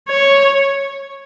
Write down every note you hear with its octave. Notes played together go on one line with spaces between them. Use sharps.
C#5